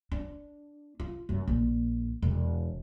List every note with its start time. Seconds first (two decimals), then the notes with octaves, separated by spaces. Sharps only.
0.12 D4
1.00 F4
1.29 F#2
1.48 A#1
2.22 E1